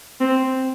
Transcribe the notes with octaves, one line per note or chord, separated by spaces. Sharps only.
C4